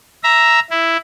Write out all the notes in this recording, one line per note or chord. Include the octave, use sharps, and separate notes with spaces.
E5 A#5
E4